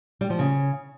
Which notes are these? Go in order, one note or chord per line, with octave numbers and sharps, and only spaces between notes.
G3
F3
C#3